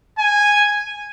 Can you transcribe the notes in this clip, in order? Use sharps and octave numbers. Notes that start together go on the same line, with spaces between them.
G#5